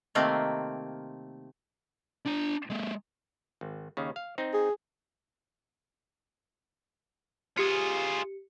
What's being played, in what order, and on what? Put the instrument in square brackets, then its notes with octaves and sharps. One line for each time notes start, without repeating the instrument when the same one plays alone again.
[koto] C3 D#3 A3 A#3 C4
[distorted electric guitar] D4 A#5
G#3 A#3
[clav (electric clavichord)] G#1
D#2 C#3
F5
C4 D#4
[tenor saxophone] G#4
[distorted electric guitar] F4 G#4 [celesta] G4 C#7